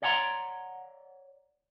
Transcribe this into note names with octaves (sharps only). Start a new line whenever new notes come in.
C#5 D5 F#5 G5 A#5 C6